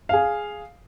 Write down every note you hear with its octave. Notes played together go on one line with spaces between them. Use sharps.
G#4 F5